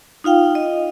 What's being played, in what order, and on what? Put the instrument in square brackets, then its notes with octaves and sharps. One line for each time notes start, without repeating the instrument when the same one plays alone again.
[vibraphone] D#4 F4 F5 G5
D#5